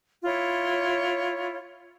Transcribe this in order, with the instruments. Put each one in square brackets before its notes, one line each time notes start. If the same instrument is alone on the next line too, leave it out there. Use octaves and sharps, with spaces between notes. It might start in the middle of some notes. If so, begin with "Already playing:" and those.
[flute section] E4 F4 C#5